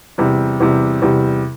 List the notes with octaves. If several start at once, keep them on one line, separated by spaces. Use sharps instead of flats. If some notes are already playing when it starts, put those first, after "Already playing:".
E2 C3 G3
E2 C3 G3
E2 C3 G3